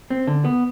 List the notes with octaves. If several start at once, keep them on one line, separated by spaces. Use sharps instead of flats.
C4
D3
B3